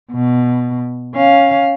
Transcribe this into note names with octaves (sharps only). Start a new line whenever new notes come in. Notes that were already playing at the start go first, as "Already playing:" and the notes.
B2
C#4 F5